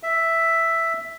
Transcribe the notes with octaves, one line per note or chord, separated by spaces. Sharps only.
E5